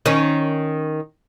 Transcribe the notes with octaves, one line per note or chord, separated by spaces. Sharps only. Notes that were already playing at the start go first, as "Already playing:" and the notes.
D#3 C#4